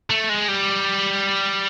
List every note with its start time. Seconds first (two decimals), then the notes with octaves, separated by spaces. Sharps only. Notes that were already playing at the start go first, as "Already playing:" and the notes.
0.10 A3
0.30 G#3
0.48 G3